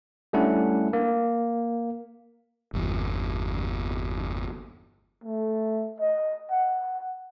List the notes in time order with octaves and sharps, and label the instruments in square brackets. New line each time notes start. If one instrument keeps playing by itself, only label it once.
[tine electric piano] G3 A3 C#4 D4 E4 F#5
A#3
[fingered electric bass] G1 E2
[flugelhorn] A3
D#5
F#5